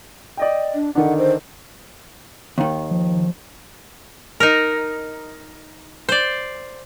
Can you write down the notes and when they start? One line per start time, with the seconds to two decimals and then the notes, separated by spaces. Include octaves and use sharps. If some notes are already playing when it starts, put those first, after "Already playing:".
0.37 D5 D#5 G5
0.75 D4
0.95 D3 D#3 D4 F#5
1.18 C5
2.58 D#2 D#3
2.91 F3
4.40 D#4 A#4
6.09 C5 D5